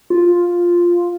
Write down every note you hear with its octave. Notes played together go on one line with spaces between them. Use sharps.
F4